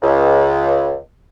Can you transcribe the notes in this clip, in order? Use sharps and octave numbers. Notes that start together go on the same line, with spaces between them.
C#2